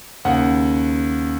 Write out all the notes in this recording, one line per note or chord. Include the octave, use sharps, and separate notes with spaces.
D#2 C#3 F#5